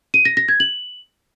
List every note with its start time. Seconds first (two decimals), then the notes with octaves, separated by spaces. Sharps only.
0.14 D#7
0.25 A#6
0.37 A#6
0.48 G#6
0.60 F#7